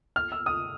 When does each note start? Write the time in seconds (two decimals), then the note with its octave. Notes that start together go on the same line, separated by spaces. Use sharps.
0.16 F6
0.32 E6
0.46 D#6